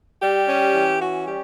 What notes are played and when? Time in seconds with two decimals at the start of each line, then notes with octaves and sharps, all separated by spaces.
0.22 G3 G4
0.49 C#4
0.74 E3
1.01 C#4 F#4
1.27 G3 G4